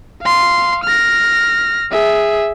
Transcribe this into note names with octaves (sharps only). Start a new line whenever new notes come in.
F5 C6
F6 A#6
G#4 E5